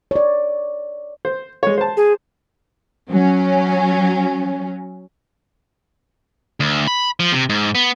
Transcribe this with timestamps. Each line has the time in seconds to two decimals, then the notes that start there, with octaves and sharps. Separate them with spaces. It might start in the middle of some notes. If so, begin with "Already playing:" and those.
0.11 C#5 D5
1.25 C5
1.63 G#3 C#5
1.78 C5 A5
1.97 G#4
3.11 F#3 C#4
6.60 D2
6.87 B5
7.20 F3
7.33 C3
7.49 G#2
7.75 B3